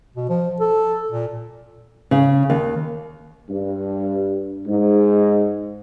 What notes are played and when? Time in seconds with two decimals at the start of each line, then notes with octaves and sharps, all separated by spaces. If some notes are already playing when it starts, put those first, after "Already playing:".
0.16 B2
0.29 F3
0.60 A4
1.12 A#2
2.11 C#3
2.50 D#2
3.50 G2
4.67 G#2